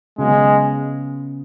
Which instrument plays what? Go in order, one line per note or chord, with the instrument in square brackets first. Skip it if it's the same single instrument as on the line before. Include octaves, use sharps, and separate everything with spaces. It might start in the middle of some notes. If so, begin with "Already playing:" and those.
[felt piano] C#3 F#3 B3 [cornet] G#3